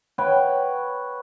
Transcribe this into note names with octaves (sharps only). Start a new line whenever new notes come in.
B4 C#5 F#5 G5